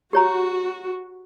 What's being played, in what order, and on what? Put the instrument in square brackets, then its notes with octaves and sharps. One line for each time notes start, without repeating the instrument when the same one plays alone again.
[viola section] F#4 [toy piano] G4 C#5 A#5